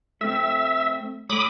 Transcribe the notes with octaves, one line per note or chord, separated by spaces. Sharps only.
A3 C4 E5
A3 C#5 B5 D6 D#6